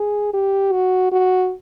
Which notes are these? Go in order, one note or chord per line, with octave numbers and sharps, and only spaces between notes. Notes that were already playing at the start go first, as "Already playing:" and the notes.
Already playing: G#4
G4
F#4
F#4